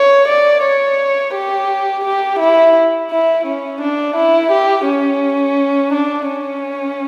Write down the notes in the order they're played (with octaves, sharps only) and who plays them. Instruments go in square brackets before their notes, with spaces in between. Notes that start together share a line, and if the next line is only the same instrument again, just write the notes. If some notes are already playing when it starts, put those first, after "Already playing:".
Already playing: [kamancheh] C#5
D5
C#5
G4
G4
E4
E4
C#4
D4
E4
G4
C#4
D4
C#4